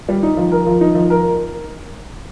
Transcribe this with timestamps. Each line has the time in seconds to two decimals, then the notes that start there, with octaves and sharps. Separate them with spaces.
0.09 G3
0.23 D#4
0.37 F3
0.52 A#4
0.66 F3
0.81 D#4
0.95 F3
1.10 A#4